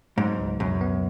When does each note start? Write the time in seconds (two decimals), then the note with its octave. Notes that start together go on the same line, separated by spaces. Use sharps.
0.17 G#2 F#3
0.39 C#2
0.60 F#2 B2
0.81 B3